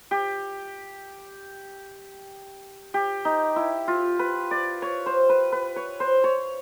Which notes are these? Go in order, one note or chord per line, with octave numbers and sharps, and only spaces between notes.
G4
G4
D#4
E4
F4
B4
D5
C#5
C5
B4
B4
C#5
C5
C#5